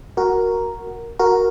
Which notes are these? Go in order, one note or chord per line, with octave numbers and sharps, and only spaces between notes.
F#4 A#4
F#4 A#4